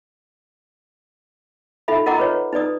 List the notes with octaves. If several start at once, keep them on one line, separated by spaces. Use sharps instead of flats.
D#4 F4 A4 E5 B5
F4 A#4 D#5 F#5 A#5 D6
F4 B4 C#5
D#4 B4 D5 D#6